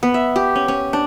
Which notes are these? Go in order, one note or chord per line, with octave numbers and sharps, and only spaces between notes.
B3
E5
G4
C#4
C#4
D4